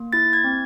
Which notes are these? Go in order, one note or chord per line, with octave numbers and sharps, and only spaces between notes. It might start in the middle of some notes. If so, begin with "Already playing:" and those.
Already playing: A#3
E4 A6
G#6
C4